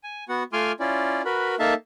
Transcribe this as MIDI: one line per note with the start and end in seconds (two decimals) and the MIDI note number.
0.04 0.24 80
0.29 0.43 59
0.29 0.43 66
0.29 0.43 78
0.53 0.72 57
0.53 0.72 65
0.53 0.72 80
0.53 0.72 84
0.53 0.72 86
0.53 0.72 89
0.80 1.22 61
0.80 1.22 64
0.80 1.22 65
0.80 1.22 74
1.25 1.55 66
1.25 1.55 70
1.25 1.55 71
1.25 1.55 83
1.59 1.74 58
1.59 1.74 63
1.59 1.74 69
1.59 1.74 76
1.59 1.74 77
1.59 1.74 81